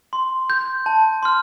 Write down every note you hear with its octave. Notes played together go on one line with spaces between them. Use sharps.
C6
G6
A5
C6 F6